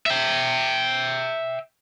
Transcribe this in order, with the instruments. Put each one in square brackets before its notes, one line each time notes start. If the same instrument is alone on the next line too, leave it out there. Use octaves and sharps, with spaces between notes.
[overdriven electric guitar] E5 G5